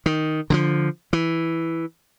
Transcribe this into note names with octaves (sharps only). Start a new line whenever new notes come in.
D#3
D3 D#3 F3
E3